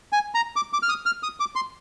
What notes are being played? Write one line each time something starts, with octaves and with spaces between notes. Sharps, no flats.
G#5
A#5
D6
D6
F6
D#6
F6
D#6
D6
C6